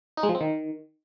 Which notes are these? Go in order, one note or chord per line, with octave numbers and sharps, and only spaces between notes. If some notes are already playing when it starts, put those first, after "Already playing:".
D#4
G#3
F3
C4
D#3